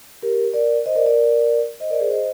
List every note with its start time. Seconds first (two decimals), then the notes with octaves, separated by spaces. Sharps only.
0.22 G4 A#4
0.54 A#4 D5
0.86 C5 D#5
0.96 A#4 D5
1.06 A#4 D5
1.80 C5 D#5
1.90 A#4 D5
2.00 G#4 C5
2.11 C5 D#5